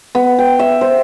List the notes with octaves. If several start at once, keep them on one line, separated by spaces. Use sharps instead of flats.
B3
G5
E5
C5